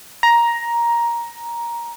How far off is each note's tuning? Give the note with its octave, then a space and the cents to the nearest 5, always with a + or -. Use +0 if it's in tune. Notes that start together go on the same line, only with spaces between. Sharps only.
A#5 +10